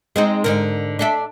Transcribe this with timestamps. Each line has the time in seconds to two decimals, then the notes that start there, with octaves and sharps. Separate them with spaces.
0.16 G#3 C4 D#4
0.44 G#2 D3 A#4
0.99 D4 A4 E5